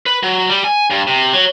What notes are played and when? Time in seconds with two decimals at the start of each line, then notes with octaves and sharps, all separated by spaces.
0.06 B4
0.23 F#3
0.50 G3
0.64 G#5
0.90 G2
1.07 C3
1.33 F#3